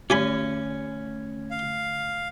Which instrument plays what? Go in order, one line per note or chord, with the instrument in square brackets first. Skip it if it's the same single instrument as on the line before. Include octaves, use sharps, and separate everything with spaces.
[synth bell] D3 A3 [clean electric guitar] C#4 [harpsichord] G4 G#5 B5
[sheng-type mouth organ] F5